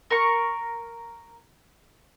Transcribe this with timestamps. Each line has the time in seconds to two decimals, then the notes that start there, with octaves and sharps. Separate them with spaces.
0.10 A#4 A#5 C#6